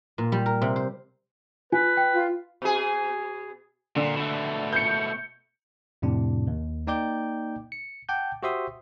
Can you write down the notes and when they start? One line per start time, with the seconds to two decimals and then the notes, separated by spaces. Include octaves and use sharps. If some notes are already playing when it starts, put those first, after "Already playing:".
0.18 A#2
0.32 G3
0.46 A#4
0.61 C3
0.76 C5
1.72 F4 B4 G#5
1.97 G5
2.14 F4
2.62 B2 G#4
3.96 A#2 D3
4.17 B2 A3
4.73 G6 C#7
6.02 F2 A2 C3 D4
6.47 D#2
6.87 A#3 D#4 D5 G5 D6 G6
7.72 C#7
8.09 F#5 G5 A5 D6 G6
8.43 F#4 G4 C5 E5 C6 D#6